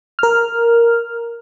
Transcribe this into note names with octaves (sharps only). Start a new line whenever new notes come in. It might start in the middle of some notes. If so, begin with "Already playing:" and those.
A#4 F6